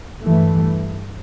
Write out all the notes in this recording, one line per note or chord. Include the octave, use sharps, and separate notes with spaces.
G2 E3 A3